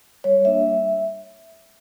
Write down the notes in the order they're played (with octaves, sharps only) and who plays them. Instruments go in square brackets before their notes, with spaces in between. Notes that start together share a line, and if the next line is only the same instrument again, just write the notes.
[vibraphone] G3 C#5
A#3 D4 E5
G3